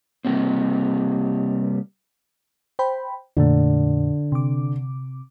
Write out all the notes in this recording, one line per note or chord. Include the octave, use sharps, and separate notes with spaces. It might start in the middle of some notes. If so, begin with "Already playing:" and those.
C3 E3 G3 A#3 C4
C5 G5 B5
F2 A#2 D3 A3
C3 D6